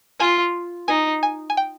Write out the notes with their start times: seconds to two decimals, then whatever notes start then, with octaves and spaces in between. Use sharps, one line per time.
0.20 F4 G#5
0.88 D#4 G#5
1.23 G#5
1.50 G#5
1.57 G5